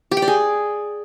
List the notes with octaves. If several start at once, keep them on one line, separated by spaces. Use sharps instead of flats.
G4
G5
D5
G#4